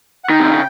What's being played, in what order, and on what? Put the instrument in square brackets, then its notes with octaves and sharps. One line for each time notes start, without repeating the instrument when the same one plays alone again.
[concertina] F#5
[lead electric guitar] D#3 [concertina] G5
[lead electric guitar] C3
C#3